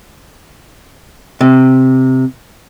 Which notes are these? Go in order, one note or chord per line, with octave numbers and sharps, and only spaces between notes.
C3